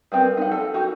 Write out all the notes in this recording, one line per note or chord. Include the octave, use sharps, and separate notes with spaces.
G3 B3 C4 A#4
D#4 F#5
A4 A#4
D#4 F#4 G4 A#4